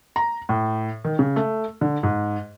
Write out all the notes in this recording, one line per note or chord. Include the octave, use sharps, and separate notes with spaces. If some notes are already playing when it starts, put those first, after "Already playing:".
A#5
A2
D#3
C#3
A3
D3
G#2